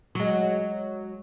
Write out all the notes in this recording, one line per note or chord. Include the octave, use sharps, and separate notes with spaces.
F#3 G#3